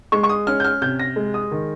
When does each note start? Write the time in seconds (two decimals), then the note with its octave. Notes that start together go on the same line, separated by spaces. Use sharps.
0.12 G#3 C#6
0.24 C#6
0.29 D#6
0.47 C#4 F6
0.60 G6
0.64 F6
0.82 C3 G6
0.99 A#6
1.16 G#3
1.34 D#6
1.51 D#3